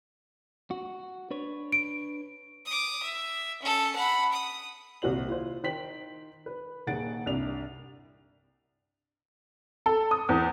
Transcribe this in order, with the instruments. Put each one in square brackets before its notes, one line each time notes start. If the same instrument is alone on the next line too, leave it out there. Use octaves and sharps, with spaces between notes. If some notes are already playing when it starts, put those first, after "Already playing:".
[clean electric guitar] F#4
D4 B4 C#5
[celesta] D7
[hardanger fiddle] D6 D#6
E5
C#4 A4
F#5 B5
D#6
[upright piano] D#1 C2 F#4 C5 F#7
E4 F4 C5
D#3 C5 G5 B6 F#7
B4
D#1 D#3 G#4 F#5 A6 D7
C2 G2 D5 F7
[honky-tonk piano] A4
D#6
E2